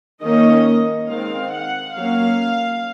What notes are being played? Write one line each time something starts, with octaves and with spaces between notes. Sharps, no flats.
D#3 A#3 C#4 D#5
D#3 G#3 C4 F5
F#5
F#3 A#3 C#4 F5